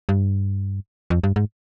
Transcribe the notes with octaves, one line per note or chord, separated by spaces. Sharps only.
G2
F2
G2
G#2